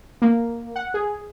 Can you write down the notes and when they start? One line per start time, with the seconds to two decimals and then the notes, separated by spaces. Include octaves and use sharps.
0.22 A#3
0.76 F#5
0.94 G#4